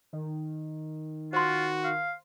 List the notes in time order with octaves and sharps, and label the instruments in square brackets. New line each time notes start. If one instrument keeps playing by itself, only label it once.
[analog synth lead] D#3
[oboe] F4 [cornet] F#4 [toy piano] C5 C6
[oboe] F5